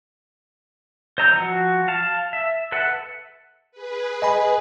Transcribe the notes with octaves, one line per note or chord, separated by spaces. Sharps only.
C5 D#5 A#5 E6 G6
F3 F#4
F5 A5
E5
A4 B4 E5 F#5
G#4 B4
D#5 G#5 B5